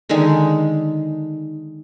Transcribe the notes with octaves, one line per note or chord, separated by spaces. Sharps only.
D3 D#3 G#3 D#4